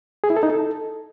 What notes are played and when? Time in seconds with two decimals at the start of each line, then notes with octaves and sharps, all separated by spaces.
0.24 G#4
0.30 E4
0.36 A4
0.43 D#4
0.49 A4